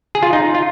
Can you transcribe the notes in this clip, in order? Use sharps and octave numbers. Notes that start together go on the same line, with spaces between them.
G#4
F4
D#4
F4